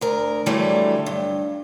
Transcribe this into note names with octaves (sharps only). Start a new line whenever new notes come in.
D2 A#4
D3 E3 F#3 G3 A3
G2